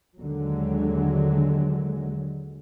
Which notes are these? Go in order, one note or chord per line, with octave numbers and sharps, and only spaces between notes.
D#2 D3 F#3 G#3